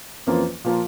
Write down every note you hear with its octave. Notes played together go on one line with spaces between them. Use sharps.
F2 E3 A#3 C#4 F4
A#2 F3 A#3 F4 A#4